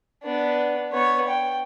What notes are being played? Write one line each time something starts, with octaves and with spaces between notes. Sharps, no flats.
B3 D4
B3 C#5
G5